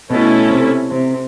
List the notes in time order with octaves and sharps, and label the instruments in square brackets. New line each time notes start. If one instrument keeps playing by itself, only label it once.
[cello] B2 [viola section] A3 C#4 E4 A4
[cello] C3
C3